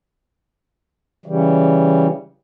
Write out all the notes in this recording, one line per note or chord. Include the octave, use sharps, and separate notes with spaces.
C#3 E3 G3